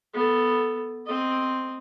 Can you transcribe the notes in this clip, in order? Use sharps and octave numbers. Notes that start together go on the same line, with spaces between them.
B3 A4
C4 D#5